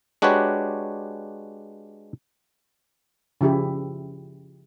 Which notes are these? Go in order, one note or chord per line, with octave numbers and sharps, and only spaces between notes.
G#3 D4 F#4 G4 B4 C#5
C#3 F3 E4 G4 G#4